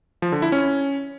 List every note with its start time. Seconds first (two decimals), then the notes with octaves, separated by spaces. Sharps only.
0.22 F3
0.32 D3
0.42 E4
0.52 C#4